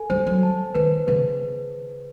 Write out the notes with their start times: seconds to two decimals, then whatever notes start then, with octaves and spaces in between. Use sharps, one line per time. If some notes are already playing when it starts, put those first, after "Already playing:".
Already playing: A4 G#5
0.10 G3 C5
0.27 F#3
0.43 A5
0.75 D#3 B4
1.07 C#3 B4